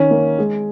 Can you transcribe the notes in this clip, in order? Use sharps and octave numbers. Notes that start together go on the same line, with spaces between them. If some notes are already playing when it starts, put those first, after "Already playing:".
Already playing: D#3 C#4
A#3
G#3